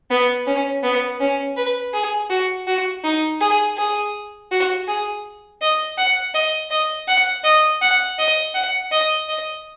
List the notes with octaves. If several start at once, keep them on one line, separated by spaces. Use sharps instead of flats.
B3
C#4
B3
C#4
B4
G#4
F#4
F#4
D#4
G#4
G#4
F#4
G#4
D#5
F#5
D#5
D#5
F#5
D#5
F#5
D#5
F#5
D#5
D#5